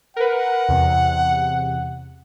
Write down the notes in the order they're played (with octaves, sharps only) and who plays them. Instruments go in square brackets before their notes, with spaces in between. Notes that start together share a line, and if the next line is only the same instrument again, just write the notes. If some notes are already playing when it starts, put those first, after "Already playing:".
[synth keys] A#4 B4 [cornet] F#5
[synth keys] E2 C3